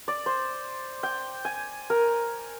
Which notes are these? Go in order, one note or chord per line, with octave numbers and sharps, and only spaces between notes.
D5
C5
G5
G#5
A#4